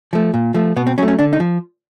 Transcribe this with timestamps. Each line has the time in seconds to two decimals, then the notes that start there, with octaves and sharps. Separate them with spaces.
0.13 F3 A3
0.34 A#2
0.54 F3 A3
0.76 B2 B3
0.87 C4
0.98 F#3 A3 C#4
1.08 C#4
1.19 D3 D4
1.33 D#4
1.40 F3